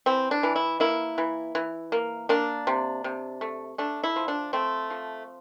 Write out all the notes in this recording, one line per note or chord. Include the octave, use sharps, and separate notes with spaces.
E3 C4
D4
E3
E4
A#3 E4
E3
E3
A#3
A#3 D4
C3
C3
A3
A3 D4
E4
F3
D4
A3 C4
F3